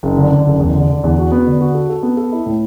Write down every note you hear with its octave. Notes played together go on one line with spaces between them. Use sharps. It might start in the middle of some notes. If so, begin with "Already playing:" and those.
F#1
D3
D3
F#1
E2
D3
D3
E2
F#4
B3
D3
F#4
A4
A4
B3
A4
E4
A2